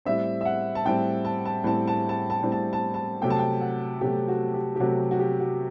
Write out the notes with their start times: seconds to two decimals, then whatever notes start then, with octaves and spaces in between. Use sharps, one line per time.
0.05 A2 G3 C4 E5
0.41 E5
0.45 F#5
0.75 A5
0.85 A2 G3 C4 G5
1.25 A5
1.45 A5
1.64 A2 G3 C4 A5
1.88 A5
2.09 A5
2.30 A5
2.43 A2 G3 C4
2.52 A5
2.73 A5
2.94 A5
3.22 C3 F#3 A3 G5
3.30 A5
3.39 G5
3.61 F#5
4.01 C3 F#3 A3 G4
4.28 F#4
4.54 G4
4.76 G4
4.80 C3 F#3 A3 F#4
5.11 F#4
5.19 G4
5.40 F#4